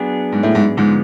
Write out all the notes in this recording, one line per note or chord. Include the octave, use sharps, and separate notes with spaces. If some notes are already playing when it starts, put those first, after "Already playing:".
Already playing: F#3 B3 D4 G#4
G#2
A2
G#2
G#2 D3 F3 G#3 B3